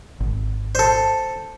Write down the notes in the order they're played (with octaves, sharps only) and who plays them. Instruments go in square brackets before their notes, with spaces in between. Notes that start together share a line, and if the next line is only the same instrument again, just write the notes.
[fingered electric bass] G#1
[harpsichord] A4 C5